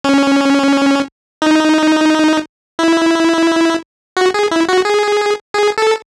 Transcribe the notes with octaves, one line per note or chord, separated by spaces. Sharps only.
C#4
D#4
E4
F#4
G#4
E4
F#4
G#4
G#4
A4